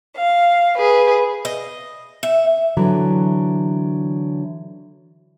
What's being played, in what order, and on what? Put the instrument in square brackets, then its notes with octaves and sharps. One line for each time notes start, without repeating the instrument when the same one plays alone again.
[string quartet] F5
G#4 B4
[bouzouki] D#5
E5
[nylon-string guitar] D3 E3 F#3